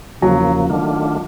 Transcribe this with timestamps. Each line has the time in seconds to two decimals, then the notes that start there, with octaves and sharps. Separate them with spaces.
0.22 E2 C#3 F3 F#3 A#3
0.70 D#3 F#3 A3 D4 F4